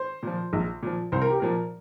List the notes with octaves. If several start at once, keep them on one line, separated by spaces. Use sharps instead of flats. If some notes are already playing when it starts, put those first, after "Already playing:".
Already playing: C5
A#2 F3
A#1
A#2 F3
C2 C5
A#4
G4
A#2 F3 A#4